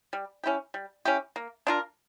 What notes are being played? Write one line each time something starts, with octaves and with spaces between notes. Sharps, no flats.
G3
C#4 E4 G4
G3
C#4 E4 G4
A#3
D4 F4 A#4